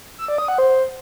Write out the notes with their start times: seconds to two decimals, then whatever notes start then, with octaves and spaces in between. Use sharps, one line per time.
0.18 E6
0.28 D5
0.38 D#6
0.48 F#5
0.58 C5